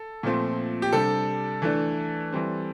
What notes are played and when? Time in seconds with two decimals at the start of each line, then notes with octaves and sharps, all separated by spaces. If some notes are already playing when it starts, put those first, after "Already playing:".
Already playing: A4
0.23 A#2 F3 A3 C4
0.82 G4
0.93 C3 G3 D4 A4
1.62 E3 A3 D4
2.32 E3 G3 C4